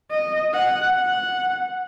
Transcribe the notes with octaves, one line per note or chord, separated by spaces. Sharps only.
D#5
F#5
F#5